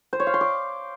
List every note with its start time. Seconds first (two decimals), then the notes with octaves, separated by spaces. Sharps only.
0.13 C5
0.20 C#5
0.27 F5
0.34 C6
0.41 D6